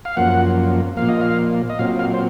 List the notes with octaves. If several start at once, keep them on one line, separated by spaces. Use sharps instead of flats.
F5
F#2 F3 A#3 F#5
A#2 F3 A#3 F5
D#5
F5
D#5
A#2 F#3 C4 F5
F5
C5